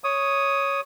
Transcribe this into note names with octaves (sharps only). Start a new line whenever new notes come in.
C#5 D#6